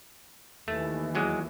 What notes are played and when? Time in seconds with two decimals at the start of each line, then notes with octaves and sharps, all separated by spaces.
0.68 D#2 D#3 E3 A3
1.15 E2 F#3 G#3